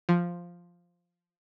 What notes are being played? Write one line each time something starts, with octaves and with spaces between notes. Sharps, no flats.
F3